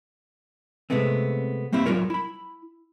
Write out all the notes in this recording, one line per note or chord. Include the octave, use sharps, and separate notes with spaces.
C3 G#3 A3 B3 C4
G3 A#3 C4 E4
F#3 G3 F4 A#4 C#5
E4 B5